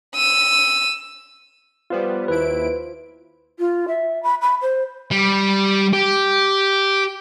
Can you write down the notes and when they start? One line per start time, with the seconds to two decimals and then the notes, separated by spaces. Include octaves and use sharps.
0.16 E6 D#7
1.90 G3 B3 F4 C5
2.28 D#2 E4 B4 D7
3.57 F4
3.88 E5
4.23 B5
4.41 B5
4.61 C5
5.11 G3
5.93 G4